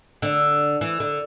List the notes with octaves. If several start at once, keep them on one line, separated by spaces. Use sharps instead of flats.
D3
E3
D3